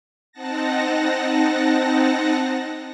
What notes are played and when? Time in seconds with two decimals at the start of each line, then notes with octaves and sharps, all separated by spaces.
0.32 C4 D#4 F#5 A5 A#6